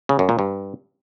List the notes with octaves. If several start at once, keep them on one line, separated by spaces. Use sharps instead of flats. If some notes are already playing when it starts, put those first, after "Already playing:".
C#3
F#2
A#2
G2